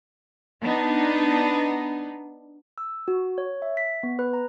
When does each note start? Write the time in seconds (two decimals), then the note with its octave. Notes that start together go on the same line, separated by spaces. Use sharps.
0.63 B3 D4 D#4
2.78 E6
3.08 F#4
3.38 C#5
3.62 E5
3.77 B6
4.03 B3
4.19 B4
4.33 A#5